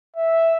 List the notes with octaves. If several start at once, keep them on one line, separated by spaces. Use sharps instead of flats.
E5